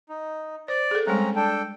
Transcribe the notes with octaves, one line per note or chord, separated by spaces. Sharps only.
D#4
C5 D5
G#4 A4
G3 G#3 C4 C#4 A#5
D4 A4 G5